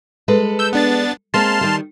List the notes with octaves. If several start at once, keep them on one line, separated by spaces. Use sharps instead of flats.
G#3 A4 B4
E6 G6
B3 D4 A6
G#3 A#3 C4 A5 C6 F6
D#3 G3